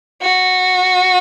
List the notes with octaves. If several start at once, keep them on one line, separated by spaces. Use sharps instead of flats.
F#4